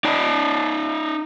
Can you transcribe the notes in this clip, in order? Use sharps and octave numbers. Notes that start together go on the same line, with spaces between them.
D#4 D5